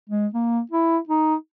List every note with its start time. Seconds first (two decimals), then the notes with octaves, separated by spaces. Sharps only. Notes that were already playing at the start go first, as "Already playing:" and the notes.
0.09 G#3
0.34 A#3
0.71 E4
1.09 D#4